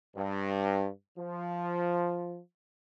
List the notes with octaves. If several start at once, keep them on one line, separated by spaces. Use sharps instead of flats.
G2
F3